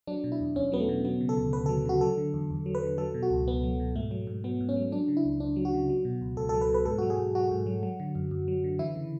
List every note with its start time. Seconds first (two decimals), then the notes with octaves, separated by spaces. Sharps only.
0.07 F#3 D4
0.24 B2
0.32 E4
0.40 E2
0.56 E2 C#4
0.72 F#3 B3
0.80 A3
0.89 B2
1.05 F#3 B3
1.21 C#3
1.29 A4
1.37 D2
1.53 D2 B4
1.66 F#3 A4
1.86 C#3 F#4
2.01 F#3 A4
2.18 D3
2.34 E2
2.50 E2
2.66 F#3
2.75 B4
2.83 D3
2.98 F#3 A4
3.14 B2
3.23 F#4
3.30 C#2
3.48 C#2 B3
3.64 F#3
3.80 B2
3.95 G#2 A3
4.11 F#3
4.27 G#2
4.44 F#3 B3
4.61 G#2
4.69 C#4
4.76 F#3
4.92 F#3 D4
5.08 C#3
5.17 E4
5.25 C#2
5.40 C#2 D4
5.56 F#3
5.65 F#4
5.74 C#3
5.90 F#3
6.05 B2
6.21 C#2
6.37 C#2 A4
6.49 A4
6.54 F#3
6.61 B4
6.69 B2
6.74 B4
6.86 G#2 A4
6.98 F#3 F#4
7.10 G#4
7.19 G#2
7.35 F#3 F#4
7.51 G#2
7.66 F#3
7.83 F#3
8.00 D3
8.15 F#2
8.31 F#2
8.48 F#3
8.64 D3
8.79 E3 E4
8.95 C#3